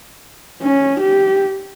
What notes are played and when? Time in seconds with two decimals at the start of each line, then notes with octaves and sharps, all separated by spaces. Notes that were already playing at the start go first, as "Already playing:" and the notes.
0.62 C#4
1.00 G4